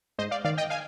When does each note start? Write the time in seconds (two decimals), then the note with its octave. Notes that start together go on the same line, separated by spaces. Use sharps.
0.18 G#2 C5 D#5
0.31 D5 F5
0.44 D#3 D5 F5
0.58 D#5 G5
0.70 F5 G#5